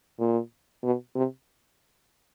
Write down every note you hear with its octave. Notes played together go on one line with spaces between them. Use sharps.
A#2
B2
C3